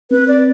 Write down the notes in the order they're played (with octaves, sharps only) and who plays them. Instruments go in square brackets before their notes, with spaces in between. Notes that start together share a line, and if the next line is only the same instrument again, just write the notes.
[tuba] C4 [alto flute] B4
[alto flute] D5